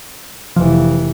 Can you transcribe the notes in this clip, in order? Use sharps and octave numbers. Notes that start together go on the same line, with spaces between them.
F1 E3 F3